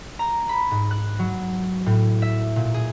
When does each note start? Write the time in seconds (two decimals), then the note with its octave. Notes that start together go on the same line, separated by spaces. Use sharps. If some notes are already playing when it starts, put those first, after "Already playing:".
0.19 A#5
0.49 B5
0.71 G#2
0.91 F#6
1.19 F#3
1.86 A2
2.22 E5
2.56 A#2
2.74 G#4